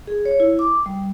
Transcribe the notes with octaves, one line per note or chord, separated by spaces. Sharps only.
G#4
C#5
E4
D6
G3